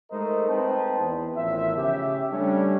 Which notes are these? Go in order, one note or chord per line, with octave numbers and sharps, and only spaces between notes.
G#3 A3 D#4 A#4 C5 D#5
C4 D#4 B4 C5 G5 A5
E2
A1 E2 D#3 F3 E5
C#3 G4 E5
G3 A3 C#4 D4